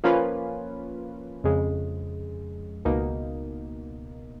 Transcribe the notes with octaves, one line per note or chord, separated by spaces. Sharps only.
F3 A#3 C#4 F4 B4
F2 C#3 G#3
C#2 B2 A#3 D#4